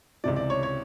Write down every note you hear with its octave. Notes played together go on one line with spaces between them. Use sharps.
C#2 C3 E3 D5
D5
C#5
C#5